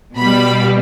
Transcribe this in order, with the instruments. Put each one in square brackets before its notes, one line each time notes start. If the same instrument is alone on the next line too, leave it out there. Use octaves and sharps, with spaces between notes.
[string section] B2 G3 B5